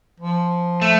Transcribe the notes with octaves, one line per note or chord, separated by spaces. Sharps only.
F3
A3